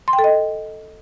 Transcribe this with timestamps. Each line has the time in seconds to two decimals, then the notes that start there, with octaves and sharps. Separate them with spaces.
0.08 C6
0.13 G5
0.19 A4
0.24 D#5